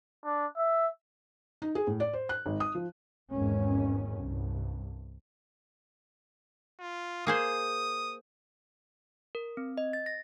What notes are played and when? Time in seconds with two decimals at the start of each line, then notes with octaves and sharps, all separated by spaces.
0.24 D4
0.56 E5
1.62 D#4
1.75 G#4
1.87 A2
2.00 D5
2.13 C5
2.29 F#6
2.46 G#1
2.60 D#6
2.75 F3
3.31 G#1 E2 G#2 D#3 C#4
4.17 C2 G2
6.80 F4
7.27 A#3 G#4 C5 D#6
9.35 A#4
9.57 C4
9.78 D#5
9.93 A6
10.06 A#6